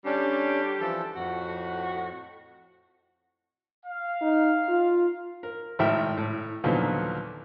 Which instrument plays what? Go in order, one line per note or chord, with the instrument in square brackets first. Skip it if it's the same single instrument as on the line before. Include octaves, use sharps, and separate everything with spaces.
[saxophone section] D3 G3 G4 [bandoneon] C#4 D4
[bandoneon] E3 F3 A4
[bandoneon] F2 [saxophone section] A2 F#4 F#5
[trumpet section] F5
[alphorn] D#4
F4
[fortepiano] A#4
G#1 A2 E5 G5 F6
A2
D#2 A#2 D3 F3 F#3 B3